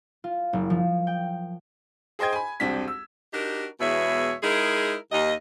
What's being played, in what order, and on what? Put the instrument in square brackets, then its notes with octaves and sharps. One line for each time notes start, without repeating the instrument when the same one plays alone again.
[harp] F4
F#1
F3
G5
[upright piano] G#4 C5 D#5 G5 G#6
G#5 B5
E1 C2 C4 D4 B6
E6
[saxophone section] D4 D#4 F#4 G4 A#4
E2 B2 G#3 E4 C#5 E5
G#3 D#4 E4 G#4 A#4
D#2 D#5